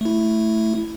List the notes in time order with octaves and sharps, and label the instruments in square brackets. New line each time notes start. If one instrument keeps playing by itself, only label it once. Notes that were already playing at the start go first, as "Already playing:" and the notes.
[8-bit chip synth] A3 E4